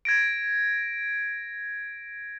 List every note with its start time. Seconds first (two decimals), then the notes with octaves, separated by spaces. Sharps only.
0.05 G#6 A#6 D7